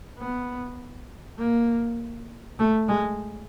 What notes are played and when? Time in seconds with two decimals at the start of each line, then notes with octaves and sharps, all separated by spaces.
0.19 B3
1.38 A#3
2.59 A3
2.88 G#3